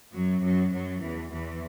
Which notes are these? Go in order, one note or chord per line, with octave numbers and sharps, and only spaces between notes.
F#2 F#3
F#2 F#3
F#2 F#3
E2 E3
E2 E3